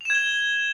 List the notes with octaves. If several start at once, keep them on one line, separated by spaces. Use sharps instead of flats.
G#6 E7 F7 G7